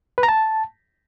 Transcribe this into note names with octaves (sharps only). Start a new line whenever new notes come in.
B4
A#5
A5